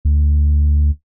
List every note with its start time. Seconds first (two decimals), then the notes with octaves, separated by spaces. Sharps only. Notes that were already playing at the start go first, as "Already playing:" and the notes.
0.05 D2